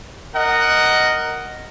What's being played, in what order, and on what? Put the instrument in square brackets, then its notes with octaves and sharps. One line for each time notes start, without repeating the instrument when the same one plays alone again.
[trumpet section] A#4 D#5 F#5